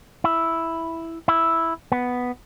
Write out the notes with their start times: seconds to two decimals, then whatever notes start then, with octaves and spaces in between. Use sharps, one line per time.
0.24 E4
1.28 E4
1.92 B3